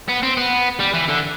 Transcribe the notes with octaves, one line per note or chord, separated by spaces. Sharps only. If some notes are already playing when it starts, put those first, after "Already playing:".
B3
C4
B3
G3
E3
D3